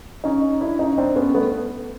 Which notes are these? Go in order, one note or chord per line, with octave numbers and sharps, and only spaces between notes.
C#4 D#4
D4 E4
C#4 D#4
C4 D4
B3 C#4
A3 B3